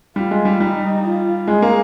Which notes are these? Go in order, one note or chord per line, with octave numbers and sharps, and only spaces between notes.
G3 F4
G#3
G3
G3 D#4
F4
G#3 G#4
A#3